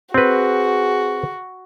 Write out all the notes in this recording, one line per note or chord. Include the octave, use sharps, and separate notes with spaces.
C4 F#4 G#4 B4